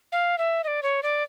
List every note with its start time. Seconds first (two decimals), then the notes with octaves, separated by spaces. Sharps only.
0.12 F5
0.38 E5
0.64 D#5
0.67 D5
0.83 C#5
1.03 D5